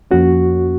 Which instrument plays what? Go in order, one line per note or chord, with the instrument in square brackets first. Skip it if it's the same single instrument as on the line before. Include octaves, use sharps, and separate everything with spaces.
[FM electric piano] F2 F3 A#3 C#4 [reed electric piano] F#4